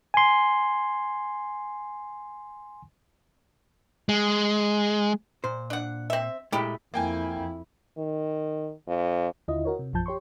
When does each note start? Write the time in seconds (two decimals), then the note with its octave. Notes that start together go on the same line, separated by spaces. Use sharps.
0.14 G#5 C6
4.09 G#3
5.44 A#2 C5
5.70 D4 F#5
6.10 C4 E5
6.52 A#2 G#3 A3 E4 G4
6.94 F2 A#3 E4 G5 G#5
7.98 D#3
8.87 F2
9.48 D#2 D3 E4 F4 D#5
9.65 F#4 A#4 C#5
9.79 C3
9.93 A#1 F#2 F3 A5 G6
10.06 G4 C#5 C6 C#6